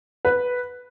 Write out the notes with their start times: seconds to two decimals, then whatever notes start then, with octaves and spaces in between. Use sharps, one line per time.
0.25 B4